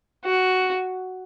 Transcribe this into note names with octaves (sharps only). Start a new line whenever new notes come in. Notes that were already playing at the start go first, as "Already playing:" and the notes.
F#4